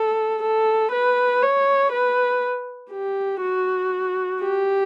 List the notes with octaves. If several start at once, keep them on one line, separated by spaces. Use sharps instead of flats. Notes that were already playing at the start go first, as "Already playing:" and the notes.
Already playing: A4
A4
B4
C#5
B4
G4
F#4
G4